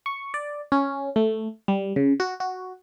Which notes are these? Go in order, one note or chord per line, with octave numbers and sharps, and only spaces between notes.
C#6
D5
C#4
A3
G3
C#3
F#4
F#4